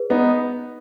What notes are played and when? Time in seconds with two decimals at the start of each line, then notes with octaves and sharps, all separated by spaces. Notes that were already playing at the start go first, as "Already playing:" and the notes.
Already playing: G#4 B4
0.10 B3 D#4